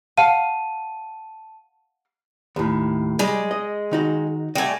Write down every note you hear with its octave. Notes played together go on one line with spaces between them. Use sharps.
F5 F#5 A5 D#7
D#2 A2
G3 G#3
D#5
D#3 D#4 F#4
G3 A3 D#5 F#5 G#5